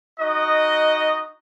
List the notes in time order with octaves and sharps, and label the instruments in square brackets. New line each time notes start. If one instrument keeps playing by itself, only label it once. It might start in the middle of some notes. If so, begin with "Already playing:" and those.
[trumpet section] D#4 F#4 D#5